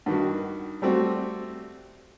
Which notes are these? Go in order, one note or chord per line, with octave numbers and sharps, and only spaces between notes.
G2 D#3 F#4
G3 A3 C4 F#4